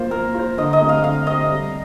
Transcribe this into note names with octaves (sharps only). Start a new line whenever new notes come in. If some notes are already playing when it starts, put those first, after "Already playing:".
Already playing: A#3 F4 C5
A#3 A#4
F4 C5
D3 D#5
D#5
A3 C4 G4
F5
D3 F5
A3 C4 G4 D#5
G3